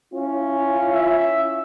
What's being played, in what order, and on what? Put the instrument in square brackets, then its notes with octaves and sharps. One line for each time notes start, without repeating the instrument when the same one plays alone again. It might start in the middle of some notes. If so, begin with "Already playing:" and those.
[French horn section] C#4 E4 F4
[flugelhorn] E5